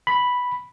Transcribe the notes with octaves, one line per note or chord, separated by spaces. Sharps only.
B5